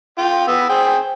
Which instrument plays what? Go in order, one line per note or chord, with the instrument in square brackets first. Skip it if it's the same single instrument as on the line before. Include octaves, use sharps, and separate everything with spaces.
[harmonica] F4 G5
B3 B4 E6
G#4 C5 G5